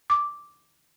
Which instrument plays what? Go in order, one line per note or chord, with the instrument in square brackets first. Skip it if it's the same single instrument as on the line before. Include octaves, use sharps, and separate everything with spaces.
[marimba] D6